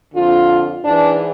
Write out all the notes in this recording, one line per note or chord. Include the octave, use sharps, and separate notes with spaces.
F2 D3 F4
G#2 E3 D4